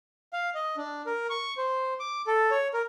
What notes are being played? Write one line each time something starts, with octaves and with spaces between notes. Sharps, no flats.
F5
D#5
D4
A#4
C#6
C5
D6
A4
C#5
A#4